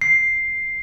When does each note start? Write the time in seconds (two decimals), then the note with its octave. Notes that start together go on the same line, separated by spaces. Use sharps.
0.01 C7